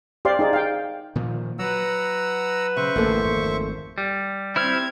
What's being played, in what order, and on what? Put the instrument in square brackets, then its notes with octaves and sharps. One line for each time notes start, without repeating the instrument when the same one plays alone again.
[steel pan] G4 C5 D5 F5 C6
D#4 G#4 D5
F5 G5
[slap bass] A#2 D#3 F3
[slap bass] F#3 [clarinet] B4 [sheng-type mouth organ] F#5 A#5 E6
[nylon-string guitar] C#3 [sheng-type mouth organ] C5 E5 C#6
[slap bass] A1 F#2 D3 [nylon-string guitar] A3 A#3 A4
[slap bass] G#1 F2
[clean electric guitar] G3
[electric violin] C4 G#6 [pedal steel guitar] E4 C5 F6